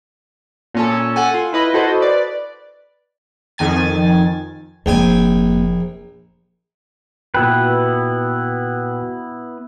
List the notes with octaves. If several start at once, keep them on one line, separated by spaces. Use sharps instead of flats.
A#2 C#4 A4
A4 F#5 G#5
F4
E4 B4 D#5 B5
E4 F#4 A4 C5 D#5
B4 D5
F2 D#3 G#5 A6
F1 A#1 A#3 G5 G#5
A#2 B3 E4 F#4 B4 G5